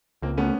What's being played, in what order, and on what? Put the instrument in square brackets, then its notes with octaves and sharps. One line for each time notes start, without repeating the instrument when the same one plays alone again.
[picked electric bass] C#2 [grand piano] A#3 C4
[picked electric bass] A3 [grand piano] B3 C#4